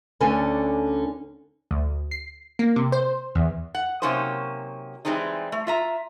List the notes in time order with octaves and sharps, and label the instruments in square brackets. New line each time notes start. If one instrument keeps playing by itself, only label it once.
[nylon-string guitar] D2 D3 C#4 A4 G#5
[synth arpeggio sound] D2
C7
A#3
C3
C5
E2
[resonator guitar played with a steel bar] F#5
C3 F#3 A#3 C#4 D#4 C5
E3 G3 G#3 C4 D#4
A3
F4 E5 A#5